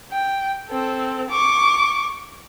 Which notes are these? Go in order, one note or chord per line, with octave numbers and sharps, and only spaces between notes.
G5
C4 A4
C#6 D6